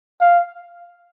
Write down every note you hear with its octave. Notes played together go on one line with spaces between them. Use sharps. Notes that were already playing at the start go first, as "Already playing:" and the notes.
F5